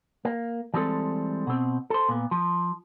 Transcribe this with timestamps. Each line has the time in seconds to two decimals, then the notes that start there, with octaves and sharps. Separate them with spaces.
0.25 A#3
0.74 E3 G3 G#3 C4 A4
1.47 B2 C4
1.90 A4 C5
2.09 A#2 B3
2.31 F3